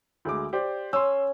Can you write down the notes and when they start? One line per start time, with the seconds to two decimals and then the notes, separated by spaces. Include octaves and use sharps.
0.25 D2 G#3 D6
0.53 G4 C5 D5
0.93 C#4 C6 E6